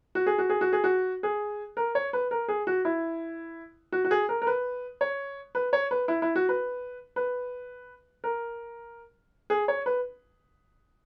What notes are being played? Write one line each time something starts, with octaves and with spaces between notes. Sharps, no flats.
F#4
G#4
F#4
G#4
F#4
G#4
F#4
G#4
A#4
C#5
B4
A#4
G#4
F#4
E4
F#4
F#4
G#4
A#4
A#4
B4
C#5
B4
C#5
B4
E4
E4
F#4
B4
B4
A#4
G#4
C#5
B4